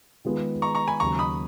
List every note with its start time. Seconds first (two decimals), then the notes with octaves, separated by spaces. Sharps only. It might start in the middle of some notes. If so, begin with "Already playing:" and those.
0.25 D#3 G#3 B3 F4 G#4
0.62 A#5 C#6
0.75 A#5 C#6
0.87 G#5 B5
1.00 D#2 C#3 F#3 A#5 C#6
1.19 B5 D#6